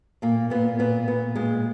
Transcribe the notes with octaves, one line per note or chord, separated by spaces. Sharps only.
A#2 A#3
A#2 B3
A#2 B3
A#2 B3
A#2 G#3